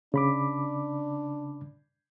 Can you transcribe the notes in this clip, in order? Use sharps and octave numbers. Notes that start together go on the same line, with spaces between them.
C#3 D4 B5 D6